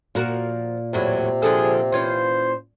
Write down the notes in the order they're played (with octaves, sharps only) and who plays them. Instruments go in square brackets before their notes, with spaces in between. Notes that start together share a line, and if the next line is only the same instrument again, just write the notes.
[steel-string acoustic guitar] A#2 [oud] F3 F#4 A#4
[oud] E2 A2 F#3 [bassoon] C3
[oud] D3 F3 A4 [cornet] G#4
[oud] E3 C#4 F4 [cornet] C5